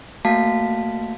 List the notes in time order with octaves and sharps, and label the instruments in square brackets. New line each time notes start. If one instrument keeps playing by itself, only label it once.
[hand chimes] A3 A#3 F#4 F5 A5 B6